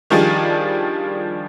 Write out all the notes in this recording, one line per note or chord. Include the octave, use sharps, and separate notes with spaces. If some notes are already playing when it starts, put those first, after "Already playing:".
D#3 F3 G3 D4 F4 G#4